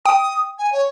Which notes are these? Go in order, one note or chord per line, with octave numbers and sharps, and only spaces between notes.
G5 D#6
G#5
C#5